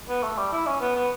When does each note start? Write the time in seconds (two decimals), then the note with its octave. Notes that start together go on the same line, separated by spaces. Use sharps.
0.09 B3
0.23 A3
0.38 G3
0.53 E4
0.66 C#4
0.81 B3
0.96 B3